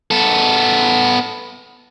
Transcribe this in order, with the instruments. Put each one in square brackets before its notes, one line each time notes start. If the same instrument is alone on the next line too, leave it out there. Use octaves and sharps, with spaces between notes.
[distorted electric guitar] B3 A4